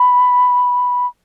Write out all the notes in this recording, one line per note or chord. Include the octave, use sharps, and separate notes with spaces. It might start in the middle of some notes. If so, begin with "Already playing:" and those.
Already playing: B5